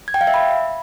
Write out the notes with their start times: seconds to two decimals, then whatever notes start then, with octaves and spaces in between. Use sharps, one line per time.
0.08 G#6
0.14 G5
0.21 F5
0.27 E5
0.34 B5